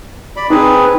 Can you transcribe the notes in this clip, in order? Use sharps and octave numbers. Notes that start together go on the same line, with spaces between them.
D5 B5
C4 D#4 G#4 B4